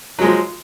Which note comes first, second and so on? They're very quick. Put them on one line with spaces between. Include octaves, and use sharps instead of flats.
F#3 G#3 F3